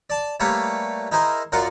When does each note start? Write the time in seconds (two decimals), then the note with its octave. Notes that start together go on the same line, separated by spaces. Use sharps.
0.10 D5 A5
0.40 G3 A3 A#3 B4 C#5 F5
1.12 D#4 E4 G#4 A#4 C5
1.52 F#2 F4 A#4 D5 F#5